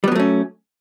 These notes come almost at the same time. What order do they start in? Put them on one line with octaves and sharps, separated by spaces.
G3 B3 F#3 A3 C#4